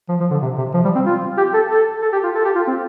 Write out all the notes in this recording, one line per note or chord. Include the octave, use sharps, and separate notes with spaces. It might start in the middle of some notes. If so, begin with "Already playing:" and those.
F3
F3
D3
C3
C3
F3
G3
C4
F4
G4
A4
A4
A4
G4
F4
A4
G4
F4
C4